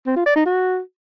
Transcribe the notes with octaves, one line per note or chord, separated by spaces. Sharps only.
C4
F4
D5
D#4
F#4